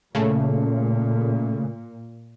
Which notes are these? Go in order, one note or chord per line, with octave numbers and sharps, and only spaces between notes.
A#2 C#3 A3